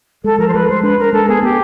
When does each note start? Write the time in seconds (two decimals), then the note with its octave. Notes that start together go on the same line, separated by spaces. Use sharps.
0.24 G#3 A4
0.38 F3 A#4
0.48 C5
0.54 G#3 B4
0.68 G#3 C5
0.83 D4 B4
0.98 D4 A#4
1.13 G#3 A4
1.28 B3 G#4
1.43 B3 G4